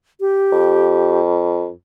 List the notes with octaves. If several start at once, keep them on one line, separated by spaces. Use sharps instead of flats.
G4
F2